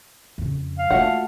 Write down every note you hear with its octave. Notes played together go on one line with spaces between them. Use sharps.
F2 C#3
F5
A3 A#3 F4 F#4 F#5